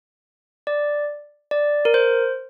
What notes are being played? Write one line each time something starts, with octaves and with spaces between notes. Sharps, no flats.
D5
D5
A#4
C5